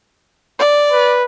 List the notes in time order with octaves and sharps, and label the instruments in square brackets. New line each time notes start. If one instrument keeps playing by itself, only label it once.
[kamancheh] D5
[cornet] B4